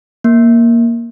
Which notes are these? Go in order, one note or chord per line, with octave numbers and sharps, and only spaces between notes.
A#3